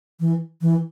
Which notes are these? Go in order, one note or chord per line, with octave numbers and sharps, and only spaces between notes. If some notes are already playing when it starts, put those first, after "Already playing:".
E3
E3